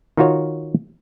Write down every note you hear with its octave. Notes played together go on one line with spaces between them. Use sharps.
D#3 D#4 F4 F#4 C#5